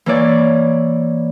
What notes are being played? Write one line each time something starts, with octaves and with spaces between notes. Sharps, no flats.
E3 A#3 C#5 D5